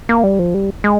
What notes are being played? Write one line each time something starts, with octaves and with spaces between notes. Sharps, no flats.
A#3
G3
F3
G3
G#3